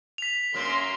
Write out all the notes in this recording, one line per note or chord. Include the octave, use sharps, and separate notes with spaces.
B6 F7
F#2 A#3 C#4 C6